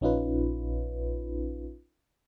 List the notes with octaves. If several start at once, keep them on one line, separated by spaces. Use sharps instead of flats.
A#1 C#4 D#4 F4 B4